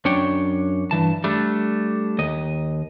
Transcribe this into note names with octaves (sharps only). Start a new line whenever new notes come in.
F#2 D4 C#5 G5
G2 E3 A5
G3 A3 D4
D#2 D#5